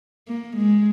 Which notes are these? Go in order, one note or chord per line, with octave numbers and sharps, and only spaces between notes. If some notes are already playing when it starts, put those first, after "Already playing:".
A#3
G#3